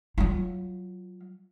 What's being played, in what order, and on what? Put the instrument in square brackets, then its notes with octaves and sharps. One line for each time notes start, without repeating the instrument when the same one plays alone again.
[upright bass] F#3 F4